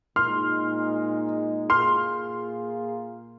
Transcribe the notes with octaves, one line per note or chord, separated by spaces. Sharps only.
A#2 G#3 D#4 C6 F6
A#2 A#3 F4 G#4 C6 F6